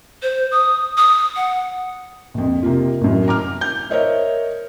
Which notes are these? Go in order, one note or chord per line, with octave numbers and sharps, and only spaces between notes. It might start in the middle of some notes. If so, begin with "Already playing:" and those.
C5
D#6
D#6
F#5
A#1 F2
C3 A#3 F4
A1 F#2
A#5 D6 F6
G6
A#4 C5 C#5 D#5 E5